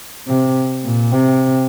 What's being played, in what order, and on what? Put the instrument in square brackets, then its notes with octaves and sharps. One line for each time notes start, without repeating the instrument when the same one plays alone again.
[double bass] C3
A#2
C3